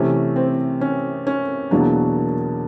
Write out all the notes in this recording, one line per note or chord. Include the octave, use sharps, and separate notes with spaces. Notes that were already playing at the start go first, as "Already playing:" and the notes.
Already playing: C3 E3 A3 C#4
C4
C#4
C#4
E2 B2 F#3 A#3 D4